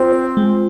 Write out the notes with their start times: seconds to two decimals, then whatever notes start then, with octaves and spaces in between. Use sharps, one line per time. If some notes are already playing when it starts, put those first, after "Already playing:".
Already playing: C4 F4 C5
0.12 C5
0.37 G#3